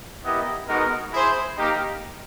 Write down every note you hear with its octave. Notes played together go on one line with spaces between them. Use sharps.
B3 E4 G4 A#4 D#5
G#3 B3 D#4 F#4 A#4
E4 G#4 C5
A#3 D#4 G4 A#4